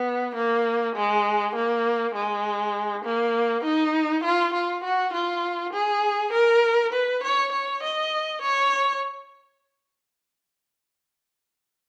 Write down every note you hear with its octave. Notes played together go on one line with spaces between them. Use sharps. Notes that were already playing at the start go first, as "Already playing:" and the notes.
Already playing: B3
A#3
G#3
A#3
G#3
A#3
D#4
F4
F4
F#4
F4
G#4
A#4
B4
C#5
C#5
D#5
C#5